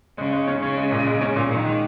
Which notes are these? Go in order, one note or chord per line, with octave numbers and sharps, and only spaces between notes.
C#3 G#3
G#3
C#4
C#3 C#4
G#3
A#2
G#3
C#4
A#2
A#2 D#3
G#3